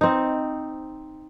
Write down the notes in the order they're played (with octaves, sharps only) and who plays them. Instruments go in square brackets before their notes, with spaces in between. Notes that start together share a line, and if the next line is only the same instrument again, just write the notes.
[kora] C4 D#4